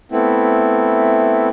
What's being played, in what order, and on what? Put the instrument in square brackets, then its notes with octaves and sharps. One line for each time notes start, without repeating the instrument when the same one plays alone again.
[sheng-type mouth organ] A3 B3 C4 E4